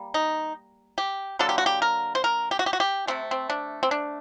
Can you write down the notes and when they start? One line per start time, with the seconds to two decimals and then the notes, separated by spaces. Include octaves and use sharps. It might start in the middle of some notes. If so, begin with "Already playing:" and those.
Already playing: G3 A#3
0.14 D#4
0.98 G4
1.39 D3 F#3 A#3 A4
1.49 G4
1.58 F#4
1.66 G4
1.82 A#4
2.15 C5
2.24 A#4
2.51 G4
2.59 F#4
2.66 G4
2.73 F#4
2.80 G4
3.07 C3 F#3 A3 C4
3.31 C4
3.50 D4
3.83 C4
3.91 D4